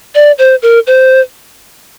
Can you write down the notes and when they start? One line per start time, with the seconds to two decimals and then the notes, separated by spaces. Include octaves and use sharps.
0.15 D5
0.39 C5
0.62 A#4
0.87 C5